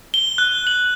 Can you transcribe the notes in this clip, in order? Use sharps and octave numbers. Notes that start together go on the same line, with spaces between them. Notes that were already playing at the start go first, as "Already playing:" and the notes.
G7
F#6
F#7